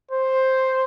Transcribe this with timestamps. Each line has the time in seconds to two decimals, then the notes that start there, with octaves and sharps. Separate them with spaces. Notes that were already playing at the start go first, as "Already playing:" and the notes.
0.11 C5